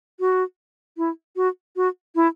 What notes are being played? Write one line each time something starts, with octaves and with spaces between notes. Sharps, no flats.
F#4
E4
F#4
F#4
E4